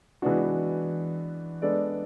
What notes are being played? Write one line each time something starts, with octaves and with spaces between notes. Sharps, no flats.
E3 G#3 B3 D4 F#4
G#3 B3 D4 A4 D5